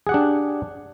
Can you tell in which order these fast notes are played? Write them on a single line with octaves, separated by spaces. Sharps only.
G#4 F#5 G4 D4